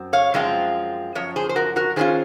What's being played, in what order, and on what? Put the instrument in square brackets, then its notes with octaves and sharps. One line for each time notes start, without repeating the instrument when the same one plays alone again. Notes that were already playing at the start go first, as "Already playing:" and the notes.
Already playing: [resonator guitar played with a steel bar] F#2 C4
C#5 F5
F#2 F3 G#3 C4 F4
F#2 F3 C#5
G#4 C5
C5
F#4 A#4
F#4 A#4
D#3 A#3 C#4 F4 G#4 C5